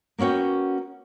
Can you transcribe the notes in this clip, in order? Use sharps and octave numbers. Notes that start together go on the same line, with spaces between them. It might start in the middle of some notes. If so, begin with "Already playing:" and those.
A#3 B3 C#4 F#4 G5